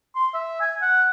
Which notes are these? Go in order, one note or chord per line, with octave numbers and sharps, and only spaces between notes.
C6
E5
G#5
F#5